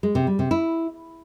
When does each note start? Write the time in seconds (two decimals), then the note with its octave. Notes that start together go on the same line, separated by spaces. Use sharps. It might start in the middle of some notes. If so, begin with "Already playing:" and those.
0.03 G#3
0.15 C3
0.27 G3
0.39 C3
0.51 E4